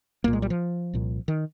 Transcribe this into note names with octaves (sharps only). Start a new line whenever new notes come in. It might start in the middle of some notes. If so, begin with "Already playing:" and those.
C2 A#2 A#3
G#3
G3
F3
C2 A#2
D#3